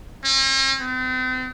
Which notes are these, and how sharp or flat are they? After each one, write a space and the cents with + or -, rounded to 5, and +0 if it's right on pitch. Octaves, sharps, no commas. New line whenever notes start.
C4 +45
C4 -40